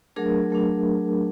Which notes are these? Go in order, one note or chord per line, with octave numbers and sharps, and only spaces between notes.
F#3 A3 D4 G#4 A#4
F#3 A3 D4